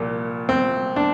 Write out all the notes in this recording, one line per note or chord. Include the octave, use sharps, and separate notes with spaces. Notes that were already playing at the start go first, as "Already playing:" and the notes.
Already playing: C2 A#2 F3
C4
D4